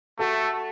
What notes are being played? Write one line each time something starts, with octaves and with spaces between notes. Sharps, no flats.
A3 F#4 A4